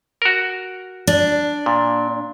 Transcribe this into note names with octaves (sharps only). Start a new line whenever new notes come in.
F#4 A#4
D4
A#2